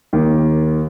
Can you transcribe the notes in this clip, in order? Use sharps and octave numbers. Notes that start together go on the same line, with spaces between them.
D#2 D#3 A#3